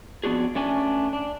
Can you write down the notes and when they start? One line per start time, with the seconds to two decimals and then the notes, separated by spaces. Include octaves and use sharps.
0.24 F2 B3 D4 F#4 G#4
0.55 A3 C#4 D4 G#5
1.13 D4